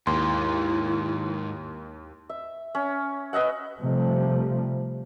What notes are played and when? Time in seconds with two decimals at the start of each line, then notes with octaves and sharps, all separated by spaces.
0.07 D#2 G#2 A#3 E4 C6
2.29 E5
2.75 C#4
3.33 B4 D#5 E5 F#5
3.80 C3 F3 G3 A3